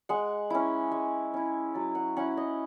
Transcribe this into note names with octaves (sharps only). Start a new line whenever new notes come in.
G#3 F#5
C#4 E4
G#3
C#4 E4
F#3 A5
F#5
C#4 E4 F#5
D#5